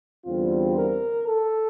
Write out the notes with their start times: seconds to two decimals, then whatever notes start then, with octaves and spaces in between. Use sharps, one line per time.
0.24 E2 D3 G3 C4 F4
0.76 A#4
1.27 A4